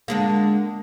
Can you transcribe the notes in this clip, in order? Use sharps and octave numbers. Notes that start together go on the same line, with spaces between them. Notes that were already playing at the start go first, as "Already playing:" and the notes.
D3 G#3 A#3